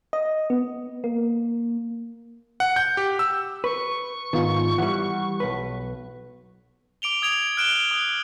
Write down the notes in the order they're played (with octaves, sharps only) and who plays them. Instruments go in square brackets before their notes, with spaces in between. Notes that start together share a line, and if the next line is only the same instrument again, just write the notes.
[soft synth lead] D#5
B3
A#3
[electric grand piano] F#5
G6
G4
E6
[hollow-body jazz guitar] B4 [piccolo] C#6
[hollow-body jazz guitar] G#2 D#3 [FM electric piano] B3 F4
[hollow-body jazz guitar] E3 G3 [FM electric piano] F#5
[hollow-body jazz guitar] B1 B4
[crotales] D6 D7 F7 G7
D#6 G#6 D7 F7
F6 F#6 D7 E7 G7
D#6